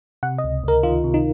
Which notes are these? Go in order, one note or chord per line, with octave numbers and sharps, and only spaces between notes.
C3 F#5
D#5
C#2
C#2 A#4
D#3 F4
C3
D#4